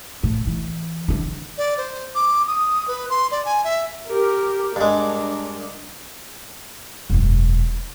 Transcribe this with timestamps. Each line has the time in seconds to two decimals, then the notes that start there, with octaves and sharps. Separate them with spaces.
0.23 A2
0.47 E3
1.08 D3 E3
1.58 D5
1.77 C5
2.15 D6
2.47 D#6
2.88 B4
3.10 C6
3.31 D5
3.45 G#5
3.64 E5
4.08 G4 A#4
4.76 G2 G#3 D4 A#4
7.10 E1 F#2